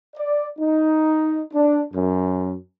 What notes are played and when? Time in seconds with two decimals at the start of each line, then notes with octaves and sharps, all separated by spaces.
0.16 D5
0.59 D#4
1.54 D4
1.94 F#2